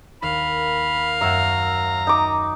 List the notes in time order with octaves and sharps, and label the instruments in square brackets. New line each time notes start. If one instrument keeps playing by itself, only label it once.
[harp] D#2 [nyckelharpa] A#4 F5 [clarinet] B5
[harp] F#2 C#5 F#5 [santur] E5 [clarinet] A#5
[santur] D#4 D6